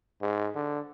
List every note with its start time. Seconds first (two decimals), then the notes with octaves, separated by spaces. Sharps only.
0.22 G#2
0.55 D3